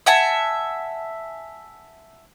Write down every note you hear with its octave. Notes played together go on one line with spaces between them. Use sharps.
E5 F#5 G#5 A5